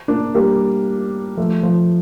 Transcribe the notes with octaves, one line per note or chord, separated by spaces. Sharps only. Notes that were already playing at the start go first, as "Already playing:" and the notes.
A#3 D4
G3 A#3
F3 A3
F3